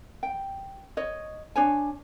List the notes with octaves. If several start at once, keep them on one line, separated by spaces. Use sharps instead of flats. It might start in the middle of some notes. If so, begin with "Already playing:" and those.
G5
C#5 D#5
D4 C#5 G#5